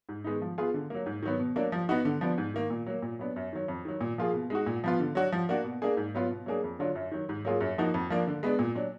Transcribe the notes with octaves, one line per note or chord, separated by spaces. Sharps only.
G#2
D#3 G#3 B3 D#4
F3
B3 F4 G#4
D3
F#3 A#3
G#2
D#3 F#3 B3
B2
F#3 A#3 D4
F3
B3 D#4 F#4
D3
F3 B3 D4
G#2
D#3 A#3
A#2
F#3 A#3
A#2
F#3 B3 D4
F#2
D#3 F#3
F2
D#3 F#3
A#2
F3 A#3 F4 G#4
B2
G#3 D#4 F#4
A#2
F3 B3 F4
D3
F#3 D4 F#4
F3
A#3 D4 F#4
B2
A#3 D4 G#4
G#2
F#3 B3 F4
B2
F#3 A#3 D4 G#4
F2
D3 F#3 D4 F4
F#2
D#3 F#3
G#2
F#3 A#3 F4 G#4
F#2
F3 A#3 D#4 F#4
F2
F3 A#3 D4
D3
G#3 B3 D4
A#2
F#3 D4